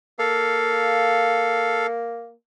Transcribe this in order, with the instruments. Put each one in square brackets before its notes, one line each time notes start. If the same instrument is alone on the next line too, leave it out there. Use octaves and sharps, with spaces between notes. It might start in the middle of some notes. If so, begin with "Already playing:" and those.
[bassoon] A#3 [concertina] A4 F5